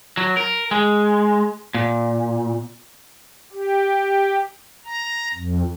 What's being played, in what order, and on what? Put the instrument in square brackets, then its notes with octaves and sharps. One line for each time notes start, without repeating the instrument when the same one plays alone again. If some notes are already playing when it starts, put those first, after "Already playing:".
[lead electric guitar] F#3
A#4
G#3
A#2
[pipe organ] G4
A#5
F2